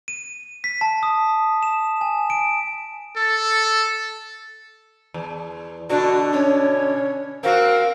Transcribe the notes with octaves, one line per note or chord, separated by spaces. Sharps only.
D#7
B6
A5
D#6
E7
G#5
D7
A4
E2
B2 D3 D4 F#4
C#4 C#5
C4 F#4 A#4 F5